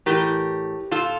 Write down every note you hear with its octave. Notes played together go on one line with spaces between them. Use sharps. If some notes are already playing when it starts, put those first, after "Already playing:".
A2 E3 G4 A#4
A#2 F4 A4